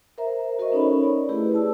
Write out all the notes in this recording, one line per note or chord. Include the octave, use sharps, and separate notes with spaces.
A#4 C5 E5 A#5
F#4 A#4 C5 D#5 C#6
C#4 D#4 A4 C#5 B5
D5
A3 E4 G4 G#4 B4
G#4 D5 A5 E6